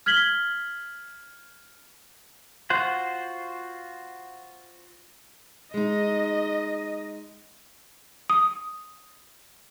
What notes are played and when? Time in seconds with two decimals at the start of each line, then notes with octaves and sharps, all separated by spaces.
0.06 F6 G#6 B6 F#7 G7
2.70 F4 F#4 C5 F#5
5.74 G#3 D#4 D#5
8.30 D#6